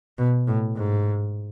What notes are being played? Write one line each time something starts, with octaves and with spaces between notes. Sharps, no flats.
B2
A2
G#2